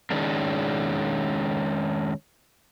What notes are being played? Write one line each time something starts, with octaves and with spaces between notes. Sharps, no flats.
D#3 G#3 C#4 D4